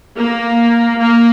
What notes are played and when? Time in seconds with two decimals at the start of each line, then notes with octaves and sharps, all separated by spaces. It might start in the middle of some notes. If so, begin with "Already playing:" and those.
0.16 A#3
1.00 A#3